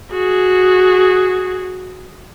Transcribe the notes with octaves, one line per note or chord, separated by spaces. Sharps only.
F#4 G#4